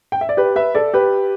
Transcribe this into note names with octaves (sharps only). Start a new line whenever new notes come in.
G5
E5
D5
G4 B4
B4 E5
A4 D5
G4 B4